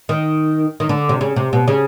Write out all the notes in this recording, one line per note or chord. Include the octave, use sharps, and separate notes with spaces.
D#3
D#3
D3
C3
C#3
C3
B2
C#3